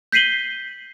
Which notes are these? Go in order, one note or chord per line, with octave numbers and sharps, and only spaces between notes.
G6 B6 C7 D#7 F#7 G7